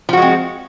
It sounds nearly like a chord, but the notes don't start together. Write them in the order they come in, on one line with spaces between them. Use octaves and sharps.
F3 F#4 G#3 C4